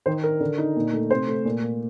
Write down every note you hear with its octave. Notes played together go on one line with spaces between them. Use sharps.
D#3 C5
D4 A#4
D3
D#4
A#2
A3
C3 C5
A3
A#2
A#3